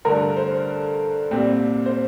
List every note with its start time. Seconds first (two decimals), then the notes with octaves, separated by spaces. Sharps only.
0.05 G2 D3 A3 A#4
0.37 C5
1.31 C2 A#2 G3 C4
1.86 C5